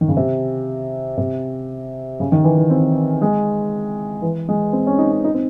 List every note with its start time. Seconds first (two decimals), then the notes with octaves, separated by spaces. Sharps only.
0.01 D#3
0.08 C#3
0.17 C3
1.18 C3
2.20 C#3
2.32 D#3
2.44 E3
2.57 E3
2.70 C4
3.22 G#3
4.22 E3
4.49 G#3
4.73 C4
4.87 C#4
4.99 D#4
5.12 C#4
5.24 D#4
5.34 C4